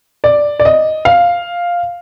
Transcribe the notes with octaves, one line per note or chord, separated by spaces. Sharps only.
D5
D5
D#5
F5